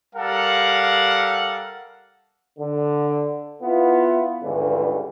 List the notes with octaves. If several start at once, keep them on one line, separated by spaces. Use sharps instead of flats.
G3 A4 A#4 F5 F#5
D3
B3 E4 F4
C#2 G2 D3 E3